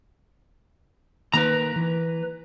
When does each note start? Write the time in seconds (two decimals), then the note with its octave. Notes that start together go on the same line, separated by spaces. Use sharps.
1.33 D#3 A#3 B4 A#5
1.76 E3